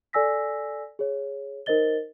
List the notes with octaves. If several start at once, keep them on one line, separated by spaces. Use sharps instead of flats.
A4 D5 G#5 E6 A#6 B6
G#4 C#5
D#4 A#4 C5 D#5 A6 G7